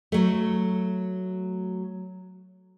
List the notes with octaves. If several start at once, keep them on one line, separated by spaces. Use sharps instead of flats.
F#3 A3